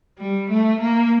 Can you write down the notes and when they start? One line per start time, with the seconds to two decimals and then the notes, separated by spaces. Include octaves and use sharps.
0.19 G3
0.50 A3
0.81 A#3